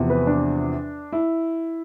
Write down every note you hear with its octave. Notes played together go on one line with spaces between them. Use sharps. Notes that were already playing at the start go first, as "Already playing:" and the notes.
Already playing: E2 C3 F3
B4
D4
E4